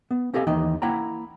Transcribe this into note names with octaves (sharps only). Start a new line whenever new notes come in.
B3
C4 G4 A4 D#5 F5 G#5
D#2 E3 D#4 D#5 G5
A#3 E4 F#5 G5 A#5